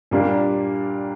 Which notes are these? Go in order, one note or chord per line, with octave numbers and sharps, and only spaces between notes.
A#2 G3 A#3 D4